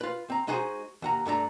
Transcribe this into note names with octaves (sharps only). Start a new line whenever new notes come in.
F4 B4
C4 A#5
G#3 D#4 F#4 G#4 C5
D#2 F#5 A#5
G2 A3 D4 A#5